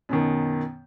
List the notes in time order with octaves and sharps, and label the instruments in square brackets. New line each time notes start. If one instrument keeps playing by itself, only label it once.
[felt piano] F#2 B2 D#3